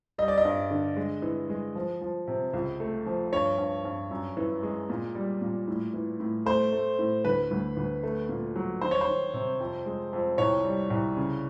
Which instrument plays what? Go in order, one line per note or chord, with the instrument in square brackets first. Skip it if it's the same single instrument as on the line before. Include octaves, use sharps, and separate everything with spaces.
[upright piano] G3 D#5
D5
D#5
G2
D3
G#3
E3
G#3
F3
F3
C3
C#2
A3
F3
G2 C#5
G2
G2
F#2
E3
G#3
A#2
G3
A#2
A2
E3
A2
A3 C5
A3
A2
D2 B4
D2
D2
A3
A#2
F#3
D#3 C5
C#5
C5
D#3
C3
F2
G#3
F2
C2 C#5
G3
C2
C#3